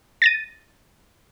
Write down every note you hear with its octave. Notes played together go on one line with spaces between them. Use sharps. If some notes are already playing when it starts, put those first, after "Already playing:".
A6 A#6 D#7